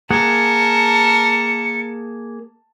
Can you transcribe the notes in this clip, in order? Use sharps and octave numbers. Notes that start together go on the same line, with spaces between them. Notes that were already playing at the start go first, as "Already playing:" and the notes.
A#3 G#4 A#4 F#5 A5 C#7